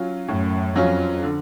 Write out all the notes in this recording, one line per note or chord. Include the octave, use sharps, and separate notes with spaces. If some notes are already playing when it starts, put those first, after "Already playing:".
Already playing: F#3 C#4 F4
F#2 A2
F2 F#3 C#4 F4
D3